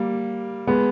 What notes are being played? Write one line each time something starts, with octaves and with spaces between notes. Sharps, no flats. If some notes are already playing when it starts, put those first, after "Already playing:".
Already playing: G3 A#3
G#3 B3